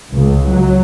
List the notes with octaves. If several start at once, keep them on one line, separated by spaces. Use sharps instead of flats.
C#2
F#3